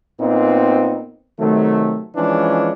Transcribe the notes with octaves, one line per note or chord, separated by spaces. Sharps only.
A#2 B3 C4 D#4
C3 D#3 F#3 A3
E3 F3 G#3 C#4 D4